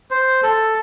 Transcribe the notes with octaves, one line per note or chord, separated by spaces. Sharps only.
C5
A4